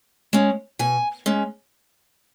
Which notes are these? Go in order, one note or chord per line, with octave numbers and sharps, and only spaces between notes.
G#3 C#4
B2 G#5
G#3 C#4